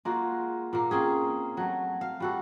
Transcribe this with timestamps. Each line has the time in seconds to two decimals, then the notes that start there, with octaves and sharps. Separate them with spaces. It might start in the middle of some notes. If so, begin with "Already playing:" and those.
0.05 G#3 A#3 F4 F#4
0.73 A#2 A#3
0.91 A#3 C4 C#4 G#4
1.57 F#3 A3
2.01 F5
2.20 G3 F#4 A4